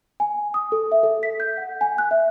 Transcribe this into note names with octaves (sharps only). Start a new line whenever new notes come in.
G#5
D#6
A4
E5
A4
B6
G6
F#5
G#5
F#6
E5